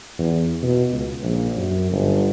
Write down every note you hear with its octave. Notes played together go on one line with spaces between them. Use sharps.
E2
B2
C#2
A#1
F#2
G1